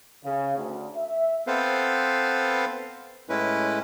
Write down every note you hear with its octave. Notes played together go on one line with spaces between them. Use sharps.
C#3
D2
E5
B3 C4 A4 B4 C5 F5
A2 G#3 C#4 E4 B4